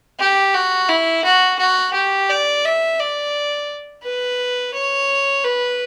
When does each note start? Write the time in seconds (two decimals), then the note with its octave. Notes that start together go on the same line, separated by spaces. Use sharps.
0.20 G4
0.54 F#4
0.89 E4
1.25 F#4
1.59 F#4
1.94 G4
2.30 D5
2.65 E5
3.00 D5
4.04 B4
4.74 C#5
5.44 B4